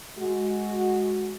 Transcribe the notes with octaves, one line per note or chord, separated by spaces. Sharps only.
G#3 F#4